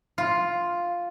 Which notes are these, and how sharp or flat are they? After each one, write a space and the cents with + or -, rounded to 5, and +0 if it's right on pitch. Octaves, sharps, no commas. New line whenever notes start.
F4 +0